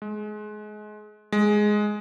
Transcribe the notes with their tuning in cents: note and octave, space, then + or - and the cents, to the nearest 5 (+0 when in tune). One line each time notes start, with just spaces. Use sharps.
G#3 +25
G#3 +5